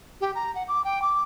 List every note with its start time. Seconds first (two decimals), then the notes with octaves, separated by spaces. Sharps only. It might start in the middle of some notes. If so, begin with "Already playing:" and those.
0.21 G4
0.35 A#5
0.55 F#5
0.68 D6
0.84 G5
1.02 D6